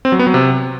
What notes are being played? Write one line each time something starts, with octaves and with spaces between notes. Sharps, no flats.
C4
F#3
B3
F#3
C3